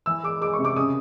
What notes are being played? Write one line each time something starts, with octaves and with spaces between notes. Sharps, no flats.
E3 E6
G#3 D6
G#3 D6
C#6
C3
D6
C#3 D#6